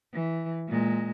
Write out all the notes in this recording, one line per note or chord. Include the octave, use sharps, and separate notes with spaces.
E3
A#2 G#3